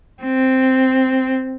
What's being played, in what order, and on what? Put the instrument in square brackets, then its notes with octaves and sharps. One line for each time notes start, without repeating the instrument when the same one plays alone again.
[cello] C4